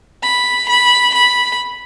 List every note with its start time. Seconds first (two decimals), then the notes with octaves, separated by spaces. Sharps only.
0.23 B5
0.69 B5
1.14 B5